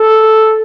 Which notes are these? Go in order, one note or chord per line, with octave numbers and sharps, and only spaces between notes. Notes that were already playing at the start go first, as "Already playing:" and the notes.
Already playing: A4